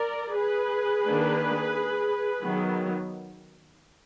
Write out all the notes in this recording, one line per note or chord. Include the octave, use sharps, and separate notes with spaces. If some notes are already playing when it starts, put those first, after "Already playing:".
Already playing: A#4 D5
G#4 B4
D#3 A#3 D4
D#3 F#3 B3